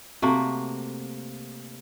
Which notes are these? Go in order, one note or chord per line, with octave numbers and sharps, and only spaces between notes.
C3 A3 A#3 F#4